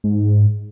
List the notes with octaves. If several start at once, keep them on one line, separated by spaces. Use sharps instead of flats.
G#2